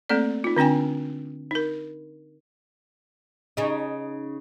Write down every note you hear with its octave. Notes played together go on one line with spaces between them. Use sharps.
A3 A#3 C4 A4 D5
D#4 F4
D3 C4 D4 G5 G#5
D#4 A#4
C#3 D#4